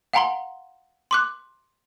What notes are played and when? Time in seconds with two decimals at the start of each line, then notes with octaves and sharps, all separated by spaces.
0.13 F5 F#5 G#5 A#5 C6 G7
1.11 C6 D6 F#6